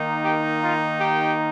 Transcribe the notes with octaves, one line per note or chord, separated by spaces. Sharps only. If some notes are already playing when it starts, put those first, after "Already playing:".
Already playing: D#3 A#3 D#4
G4
F4
G4